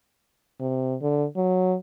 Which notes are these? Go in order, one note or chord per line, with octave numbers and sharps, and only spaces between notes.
C3
D3
F#3